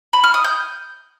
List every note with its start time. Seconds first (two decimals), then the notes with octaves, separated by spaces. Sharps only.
0.13 B5
0.24 F6
0.34 D#6
0.44 G6